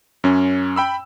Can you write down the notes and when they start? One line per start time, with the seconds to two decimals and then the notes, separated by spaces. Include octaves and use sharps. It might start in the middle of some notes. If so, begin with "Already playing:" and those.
0.24 F#2 C#4
0.76 G5 B5 E6